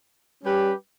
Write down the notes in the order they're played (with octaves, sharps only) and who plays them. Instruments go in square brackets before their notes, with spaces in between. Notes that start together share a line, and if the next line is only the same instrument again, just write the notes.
[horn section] G3 C#4 G4 B4